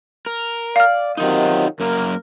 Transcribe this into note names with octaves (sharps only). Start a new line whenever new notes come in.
A#4
D5 F5 F6
C3 D#3 F#3 D#4 F4
F#2 A#3 A#4